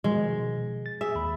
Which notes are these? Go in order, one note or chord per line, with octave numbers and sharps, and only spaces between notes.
B2 D#3 F3 G#3
A6
G#4 E5
D#2 B5